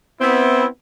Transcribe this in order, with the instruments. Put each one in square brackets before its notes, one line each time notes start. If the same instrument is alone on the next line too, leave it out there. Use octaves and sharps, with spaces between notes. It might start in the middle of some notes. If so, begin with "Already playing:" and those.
[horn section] B3 C4 E4